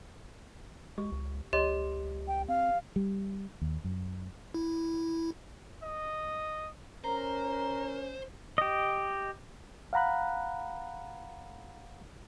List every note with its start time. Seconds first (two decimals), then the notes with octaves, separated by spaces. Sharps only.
0.98 G#3 G4
1.12 C#2
1.53 C#2 G4 C#5 D#5 C6
2.28 G5
2.48 C4 F5
2.96 G3
3.62 D#2
3.84 F#2
4.54 E4
5.83 D#5
7.04 C#4 A#4 C5 A#5
8.58 G4 D#5
9.93 F5 F#5 A#5 B5 F#6